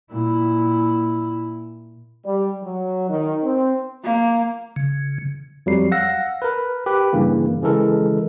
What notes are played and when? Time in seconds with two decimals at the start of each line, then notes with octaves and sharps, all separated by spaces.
0.11 A#2 E4
2.25 G3
2.63 F#3
3.09 D#3
3.44 C4
4.04 A#3
4.76 C#3
5.66 F2 F#3 G3 C7
5.91 F5 F#5 E6 A#6
6.42 A#4 B4
6.86 G4 B4
7.13 G2 C#3 E3 A#3
7.62 C#3 E3 G#3 A4 A#4